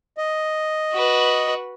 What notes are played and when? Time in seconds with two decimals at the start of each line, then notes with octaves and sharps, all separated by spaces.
0.18 D#5
0.93 F#4 B4